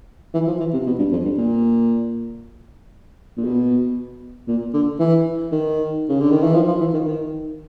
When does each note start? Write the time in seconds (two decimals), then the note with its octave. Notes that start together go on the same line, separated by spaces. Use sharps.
0.34 E3
0.47 F3
0.60 E3
0.73 C3
0.86 B2
0.99 G2
1.12 F2
1.25 G2
1.38 A#2
3.37 A#2
3.44 B2
4.48 A#2
4.73 D3
4.99 E3
5.52 D#3
6.09 C#3
6.20 D3
6.31 D#3
6.43 E3
6.55 F3
6.67 F3
6.81 E3
6.94 D#3
7.07 D#3